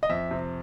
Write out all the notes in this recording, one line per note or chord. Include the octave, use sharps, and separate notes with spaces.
D#5
F2 E5
C3